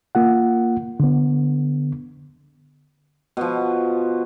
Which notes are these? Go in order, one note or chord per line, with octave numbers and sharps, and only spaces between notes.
A#3 F4 F#5
D3 B3
B2 F3